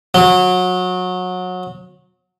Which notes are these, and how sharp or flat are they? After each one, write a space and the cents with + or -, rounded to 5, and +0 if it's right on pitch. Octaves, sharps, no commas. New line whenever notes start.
F#3 -25